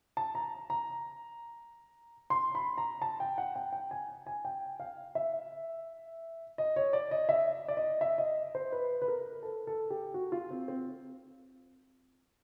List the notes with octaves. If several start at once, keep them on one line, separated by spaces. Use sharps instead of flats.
A5
A#5
A#5
C6
B5
A#5
A5
G5
F#5
G5
G5
G#5
G#5
G5
F5
E5
D#5
C#5
D5
D#5
E5
D5
D#5
E5
D#5
C5
B4
B4
A#4
A4
A4
G4
F#4
F4
C4
C4